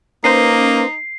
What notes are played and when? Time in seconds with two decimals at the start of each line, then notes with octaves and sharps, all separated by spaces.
0.24 A#3 C#4 D#4 B4 C5 C7